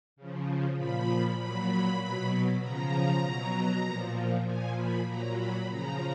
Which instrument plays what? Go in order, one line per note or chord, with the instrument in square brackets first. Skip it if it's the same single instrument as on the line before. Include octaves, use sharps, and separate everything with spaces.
[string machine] C#3 F3
A#2 F3 B5
A#2 F#3 B5
B2 F#3
C#3 F3 A#5
B2 F#3
A#2 F3
A#2 F3 G#5
B5
A#2 F#3 A#5
B5
C#3 F3 A#5